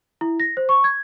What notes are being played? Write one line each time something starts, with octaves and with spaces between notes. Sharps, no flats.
E4
A#6
C5
C#6
G#6